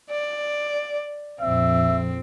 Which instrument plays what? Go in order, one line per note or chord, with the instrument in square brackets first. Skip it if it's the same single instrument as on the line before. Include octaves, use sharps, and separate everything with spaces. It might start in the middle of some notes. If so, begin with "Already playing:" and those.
[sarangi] D5
[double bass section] A#1 F2 [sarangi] C4 [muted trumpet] E5